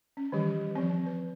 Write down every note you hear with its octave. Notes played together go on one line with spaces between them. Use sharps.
C#4
D#3 E3 G3 G4
F3 C4
B4